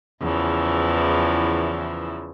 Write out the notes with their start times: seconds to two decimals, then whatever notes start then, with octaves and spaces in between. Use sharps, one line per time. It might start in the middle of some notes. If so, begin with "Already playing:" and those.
0.20 E2 C#3 E3 F3